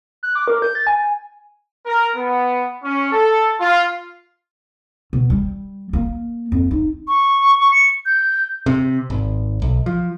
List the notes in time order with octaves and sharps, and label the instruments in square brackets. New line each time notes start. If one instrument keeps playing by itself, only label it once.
[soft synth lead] F#6
D6
A#4
G6
A6
G#5
[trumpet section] A#4
B3
C#4
A4
F4
[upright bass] B2
G3
A#3
F2
D#4
[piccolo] C#6
C#7
G6
[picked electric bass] C3
G#1
B1
F3